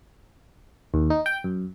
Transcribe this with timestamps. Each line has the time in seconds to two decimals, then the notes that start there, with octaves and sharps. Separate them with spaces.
0.94 D#2
1.10 D#4
1.26 G5
1.44 F#2